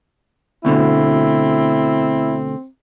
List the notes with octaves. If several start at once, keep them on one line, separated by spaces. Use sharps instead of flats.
D2 B2 D3 C4 E4